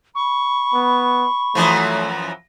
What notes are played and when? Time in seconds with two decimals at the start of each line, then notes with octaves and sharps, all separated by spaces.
0.15 B5 C#6
0.74 B3
1.55 F#2 E3 F3 A3